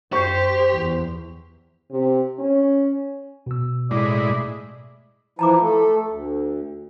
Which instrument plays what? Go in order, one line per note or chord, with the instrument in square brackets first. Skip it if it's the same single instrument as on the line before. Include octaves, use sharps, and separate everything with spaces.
[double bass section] F#2 [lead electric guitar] G4 [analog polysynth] C5 [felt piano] C#6
[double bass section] E2 E3
[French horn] C3
C#4
[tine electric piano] B2 E6
[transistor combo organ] A2 G#3 E4 [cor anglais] D5
[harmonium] E3 F3 E4 [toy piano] A5 A#5 D6
[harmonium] A3 A4
D2